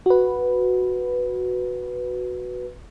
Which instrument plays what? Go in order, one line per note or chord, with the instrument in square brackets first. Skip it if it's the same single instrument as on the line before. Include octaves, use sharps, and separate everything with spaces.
[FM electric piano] F#4 B4